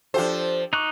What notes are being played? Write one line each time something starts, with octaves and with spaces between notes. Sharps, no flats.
F3 D4 G4 A4 C5
D#4 C#6 D6 F#6